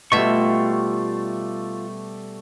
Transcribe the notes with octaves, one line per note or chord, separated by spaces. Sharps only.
B2 G3 A3 F4 E5 C#6